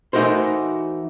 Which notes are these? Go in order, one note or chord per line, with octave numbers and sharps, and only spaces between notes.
E3 A3 D#4 F#4 A#4 C5